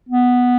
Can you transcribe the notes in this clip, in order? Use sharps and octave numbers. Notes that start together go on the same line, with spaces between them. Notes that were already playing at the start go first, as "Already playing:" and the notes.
B3